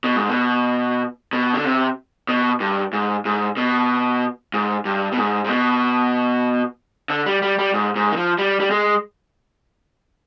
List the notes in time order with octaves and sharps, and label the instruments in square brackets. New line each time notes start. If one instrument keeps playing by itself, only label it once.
[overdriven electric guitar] B2
G#2
B2
B2
D3
C3
B2
G2
G#2
G#2
B2
G#2
G2
B2
G#2
G#2
B2
D3
G3
G3
G3
G#2
G#2
D#3
F3
G3
G3
G#3